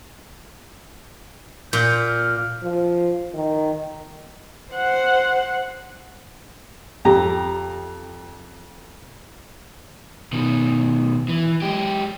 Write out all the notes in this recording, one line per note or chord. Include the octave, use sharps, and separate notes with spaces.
A#2 G6
F6
F3
D#3
C5 F#5
F2 G4 A#5
B2 D#3
E3
G#3 G4